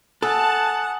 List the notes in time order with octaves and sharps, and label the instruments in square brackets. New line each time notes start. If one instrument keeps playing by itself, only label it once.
[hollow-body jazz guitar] A4 [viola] F#5 [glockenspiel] G#5 D#6 [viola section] A5